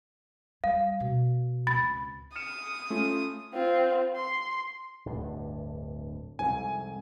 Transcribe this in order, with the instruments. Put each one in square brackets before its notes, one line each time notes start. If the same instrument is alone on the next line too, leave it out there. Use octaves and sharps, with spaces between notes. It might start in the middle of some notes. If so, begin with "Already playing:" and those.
[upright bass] G3 [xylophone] F5
[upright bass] B2
[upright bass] G#1 C#2 [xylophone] B5 A6
[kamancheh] D#6 [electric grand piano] F6 C#7 E7
[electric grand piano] A3 C#4 F4
[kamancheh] C4 F4
C6
[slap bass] D1 D2 G2
[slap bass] C2 F2 G#2 [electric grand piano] G#5